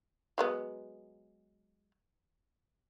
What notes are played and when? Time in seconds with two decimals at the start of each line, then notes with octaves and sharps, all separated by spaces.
0.38 F#3 G#3 B3